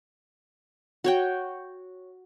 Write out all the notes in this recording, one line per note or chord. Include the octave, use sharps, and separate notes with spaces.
F#4 C#5 G5